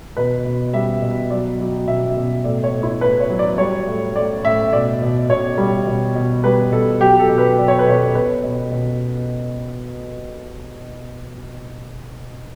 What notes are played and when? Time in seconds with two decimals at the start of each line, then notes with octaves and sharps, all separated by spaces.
0.17 B2 B4
0.45 B2
0.73 G3 E5
1.02 B2
1.30 F#3 D5
1.59 F#3
1.88 B2 E5
2.17 B2
2.44 A2 D5
2.64 C#5
2.73 A2
2.83 E4
3.01 A2 B4
3.20 C#5
3.30 F#3
3.39 D5
3.58 G3 C#5
3.87 A2
4.15 A2 D5
4.44 A2 E5
4.73 B2 D5
5.02 B2
5.29 B2 C#5
5.58 G3
5.87 B2
6.15 B2
6.44 G3 B4
6.71 B2 A4
7.00 F#3 G4
7.19 A4
7.29 B2
7.38 B4
7.58 F#3 D5
7.68 C#5
7.79 B4
7.86 B2 C#5
8.15 B2 B4
8.43 B2
8.72 B2